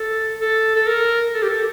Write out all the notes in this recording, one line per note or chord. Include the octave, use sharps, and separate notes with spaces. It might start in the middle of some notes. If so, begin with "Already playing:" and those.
Already playing: A4
A4
A4
A#4
A4
G4
A4